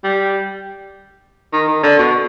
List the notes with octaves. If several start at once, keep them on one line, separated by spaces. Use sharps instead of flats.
G3
D#3
D#3
D3
B2